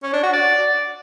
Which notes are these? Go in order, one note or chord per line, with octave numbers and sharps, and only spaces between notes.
C#4
D4
F#4
D5